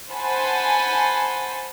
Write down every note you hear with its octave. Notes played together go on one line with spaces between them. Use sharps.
C5 F#5 G#5 A5 B5